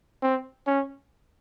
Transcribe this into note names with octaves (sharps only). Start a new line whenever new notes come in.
C4
C#4